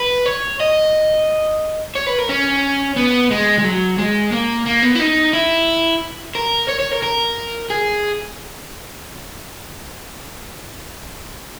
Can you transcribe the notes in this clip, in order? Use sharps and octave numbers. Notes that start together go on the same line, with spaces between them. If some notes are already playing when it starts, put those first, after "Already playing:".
Already playing: B4
C#5
D#5
C#5
B4
A#4
C#4
B3
G#3
G#3
F#3
G#3
A#3
A#3
B3
E4
D#4
E4
A#4
C#5
C#5
A#4
A#4
G#4